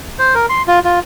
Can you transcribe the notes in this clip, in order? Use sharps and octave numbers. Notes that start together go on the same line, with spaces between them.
C5
A#4
C6
F4
F4